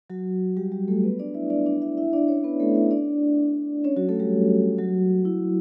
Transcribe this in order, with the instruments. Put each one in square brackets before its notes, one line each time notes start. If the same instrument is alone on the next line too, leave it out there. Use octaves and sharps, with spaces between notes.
[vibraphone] F#3 F#4
G3 G4
G3 G4
A3 A4
B3 B4
D4 D5
E4 E5
D4 D5
D4 D5
E4 E5
E4 E5
D4 D5
C#4 C#5
B3 B4
A3 A4
E4 E5
D4 D5
C#4 C#5
F#3 F#4
A3 A4
G3 G4
F#3 F#4
E4